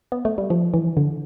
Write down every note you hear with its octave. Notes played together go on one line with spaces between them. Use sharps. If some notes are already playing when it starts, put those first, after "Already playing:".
B3
A3
G3
F3
E3
D3